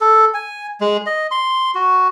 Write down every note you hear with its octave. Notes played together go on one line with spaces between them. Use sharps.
A4
G#5
G#3
D#5
C6
F#4